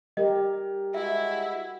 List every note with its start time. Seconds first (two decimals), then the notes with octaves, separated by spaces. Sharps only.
0.17 G3 G4 A#4 D#5
0.94 G#3 E4 F#4 E5